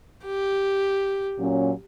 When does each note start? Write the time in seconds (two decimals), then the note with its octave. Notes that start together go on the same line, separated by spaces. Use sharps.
0.24 G4
1.38 A#2 F#3 C#4